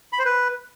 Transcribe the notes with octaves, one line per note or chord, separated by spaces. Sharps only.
B5
C5
B4